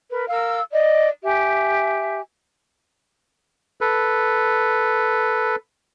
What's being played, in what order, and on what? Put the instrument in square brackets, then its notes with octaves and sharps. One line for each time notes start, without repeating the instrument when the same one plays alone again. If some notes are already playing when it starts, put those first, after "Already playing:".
[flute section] A#4 B4
A#4 F5 E6
D5 D#5
G4 E5 G#5
[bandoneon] A4 B4